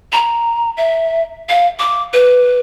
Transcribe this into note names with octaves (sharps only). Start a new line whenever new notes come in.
A#5
E5
F5
D6
B4